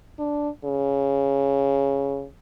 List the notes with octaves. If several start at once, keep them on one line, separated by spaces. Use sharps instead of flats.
D4
C#3